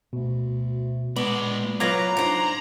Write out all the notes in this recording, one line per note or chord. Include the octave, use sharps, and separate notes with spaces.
D2 B2
A#2 G#3 B3 D5 B5
F#3 F4 B4 A#5 D6 G#6 A#6
G#2 D4 C5